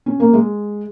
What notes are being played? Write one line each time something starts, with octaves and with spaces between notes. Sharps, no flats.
C#4
A#3
G#3